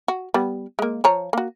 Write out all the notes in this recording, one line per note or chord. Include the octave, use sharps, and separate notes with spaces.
F#4
G3 B3
G#3 A#3
F3 C#5 A#5
A#3 F#4